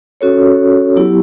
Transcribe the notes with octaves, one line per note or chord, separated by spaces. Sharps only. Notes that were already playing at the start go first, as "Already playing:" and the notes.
C#4 F#4 A4 C#5
F#3 B3 E4 G4